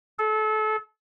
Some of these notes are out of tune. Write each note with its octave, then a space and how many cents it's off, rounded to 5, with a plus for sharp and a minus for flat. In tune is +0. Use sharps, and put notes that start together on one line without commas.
A4 -30